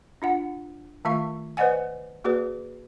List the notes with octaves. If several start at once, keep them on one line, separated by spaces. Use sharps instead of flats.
D4 F4 F#5
D#3 A3 F4 E5 F5 C#6
B4 C5 D5 D#5 F#5 G#5
A#3 F#4 G#4 B4 D5